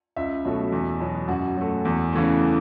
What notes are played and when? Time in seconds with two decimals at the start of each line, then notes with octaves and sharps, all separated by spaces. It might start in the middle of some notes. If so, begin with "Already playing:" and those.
0.16 C#2 E5
0.45 B2 F#3 A3
0.72 E2
1.00 B2 F#3
1.28 F#2 F#4
1.57 F#3 A3
1.85 E2
2.13 C#3 E3 A3